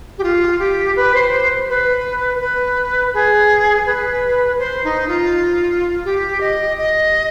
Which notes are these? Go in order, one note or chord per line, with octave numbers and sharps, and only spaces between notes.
G4
F4
G4
B4
C5
C5
B4
B4
G#4
B4
C5
D#4
F4
G4
D#5
D#5